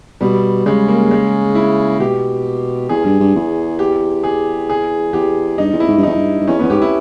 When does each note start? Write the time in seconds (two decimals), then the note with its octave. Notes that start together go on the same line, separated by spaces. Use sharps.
0.21 B2 G3
0.66 C#3 G#3
0.88 A#3
1.11 G#3
1.55 E4
2.00 B2 G4
2.89 E2 G#4
3.05 G2
3.20 G2
3.35 E2
3.79 G4
4.24 G#4
4.69 G#4
5.13 E2 G4
5.58 G2 D#4
5.73 E2
5.80 E4
5.88 G#2
5.97 G2
6.03 E2 D#4
6.16 G2
6.40 G2
6.48 E2 C#4
6.59 E2 B3
6.70 G#2 G4
6.82 E4